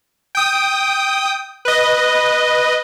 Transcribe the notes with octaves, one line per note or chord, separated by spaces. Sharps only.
G5 D#6
B4 D#5